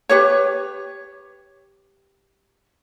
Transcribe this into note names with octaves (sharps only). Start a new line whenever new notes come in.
G4 B4 C#5